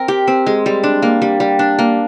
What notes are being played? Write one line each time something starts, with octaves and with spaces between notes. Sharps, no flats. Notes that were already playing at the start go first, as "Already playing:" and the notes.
Already playing: C4 A#4
G4
C4
G#3
G3
D4
A#3
G3
G3
D4
A#3